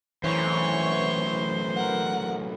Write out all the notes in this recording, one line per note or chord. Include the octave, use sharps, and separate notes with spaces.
F#2 A2 E3 C5 C#5 C#6
A#4 F#5